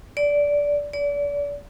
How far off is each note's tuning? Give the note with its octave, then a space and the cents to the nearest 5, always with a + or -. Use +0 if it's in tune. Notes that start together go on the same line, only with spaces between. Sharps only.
D5 -15
D5 -35